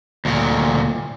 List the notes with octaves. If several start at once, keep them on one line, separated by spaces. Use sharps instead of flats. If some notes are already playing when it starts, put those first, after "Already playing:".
D2 A#2